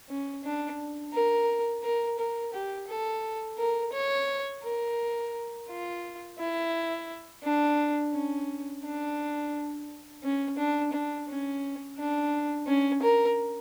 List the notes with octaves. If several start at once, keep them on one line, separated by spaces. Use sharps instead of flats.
C#4
D4
A#4
A#4
A#4
G4
A4
A#4
C#5
A#4
F4
E4
D4
C#4
D4
C#4
D4
D4
C#4
D4
C#4
A#4